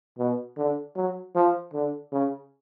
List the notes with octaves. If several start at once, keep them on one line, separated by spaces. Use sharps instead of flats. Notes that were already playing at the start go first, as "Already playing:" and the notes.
B2
D3
F#3
F3
D3
C#3